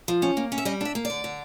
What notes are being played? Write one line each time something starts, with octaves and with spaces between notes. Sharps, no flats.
F3
C#4
A#3
C#4
E5
G3 D#5
D4 E5
A#3
D5
D3
D3